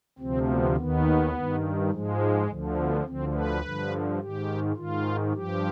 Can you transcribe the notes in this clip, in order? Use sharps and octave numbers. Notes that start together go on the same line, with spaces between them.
D2 C3 F3 C4
B3
D#2 D#3 B3
G2 D#3
G#2 F3 G#3
D2 D3 F3
B3
D2 D3 F3 C4
B4
G2 D3 F3
G#2 D#3 G4
G#2 D#3 F4
G2 F3 G4